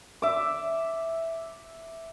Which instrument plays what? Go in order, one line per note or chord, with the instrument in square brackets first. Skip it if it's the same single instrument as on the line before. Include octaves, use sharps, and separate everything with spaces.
[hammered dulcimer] E5 D6